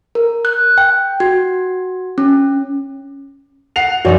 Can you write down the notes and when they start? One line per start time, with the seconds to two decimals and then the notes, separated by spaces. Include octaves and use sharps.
0.15 A#4
0.45 F#6
0.78 G5
1.20 F#4
2.18 C#4
3.76 F#5 C7 F7
4.05 F#2 F3 D#4 F#4 C#5 D5